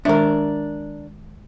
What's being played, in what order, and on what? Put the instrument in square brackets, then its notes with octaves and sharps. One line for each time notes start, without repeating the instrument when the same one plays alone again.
[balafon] D#3 G#3 E5 [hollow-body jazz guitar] D4 A#4